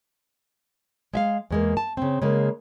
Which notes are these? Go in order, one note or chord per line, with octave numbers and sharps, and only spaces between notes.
G#3 E5 F5
E2 G#3 A#3
A5
C#3 C4
C#3 G#3 A#3